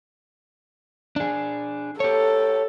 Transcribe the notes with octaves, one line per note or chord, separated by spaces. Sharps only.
D4 G#4
G4 A4 C#5